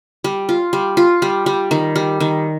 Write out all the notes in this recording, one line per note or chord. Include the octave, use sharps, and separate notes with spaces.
G3
F4
G3
F4
G3
G3
D#3
G3
D#3